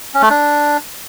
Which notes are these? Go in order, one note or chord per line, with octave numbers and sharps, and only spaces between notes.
C#4
A3
D4